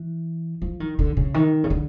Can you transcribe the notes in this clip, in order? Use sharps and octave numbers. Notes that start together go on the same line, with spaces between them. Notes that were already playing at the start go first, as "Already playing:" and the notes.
Already playing: E3
F3
D#3
D3
C#3
D#3
C#3
D3